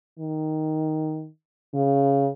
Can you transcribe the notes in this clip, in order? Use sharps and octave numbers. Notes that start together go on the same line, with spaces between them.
D#3
C#3